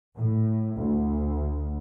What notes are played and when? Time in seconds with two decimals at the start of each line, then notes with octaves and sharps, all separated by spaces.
0.16 A2
0.77 D2